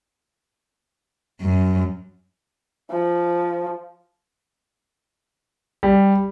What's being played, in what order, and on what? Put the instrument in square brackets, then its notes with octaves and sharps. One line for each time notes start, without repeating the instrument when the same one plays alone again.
[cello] F#2
[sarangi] F3
[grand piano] G3